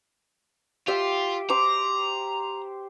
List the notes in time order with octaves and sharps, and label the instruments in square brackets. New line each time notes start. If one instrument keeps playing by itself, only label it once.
[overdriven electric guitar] F4 [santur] G4 E5 G5
[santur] C5 D6 [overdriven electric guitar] A#5